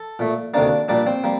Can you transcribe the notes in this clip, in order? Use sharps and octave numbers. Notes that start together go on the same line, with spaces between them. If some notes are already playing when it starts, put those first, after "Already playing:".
Already playing: A4
A#2 A3
D2 C3 D#3 A#3 D4 D5
A#2 G3 A#3 D4 D5
C4 C5
G3 A#3